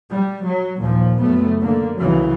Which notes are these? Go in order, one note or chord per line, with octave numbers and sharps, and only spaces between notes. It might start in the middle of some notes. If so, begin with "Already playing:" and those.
G3
F#3
D#2 A#2 F3
F#1 A3 B3
D3 A#3
C2 C#3 E3 F#3